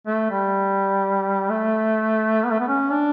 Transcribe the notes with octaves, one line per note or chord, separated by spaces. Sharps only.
A3
G3
A3
B3
A3
B3
C#4
D4